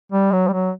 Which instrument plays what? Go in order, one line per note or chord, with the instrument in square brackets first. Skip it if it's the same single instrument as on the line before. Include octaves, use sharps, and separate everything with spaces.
[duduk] G3
F#3
G3
F#3